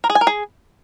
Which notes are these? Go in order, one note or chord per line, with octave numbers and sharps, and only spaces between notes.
A#4
G#4
G#5
A#4
G#4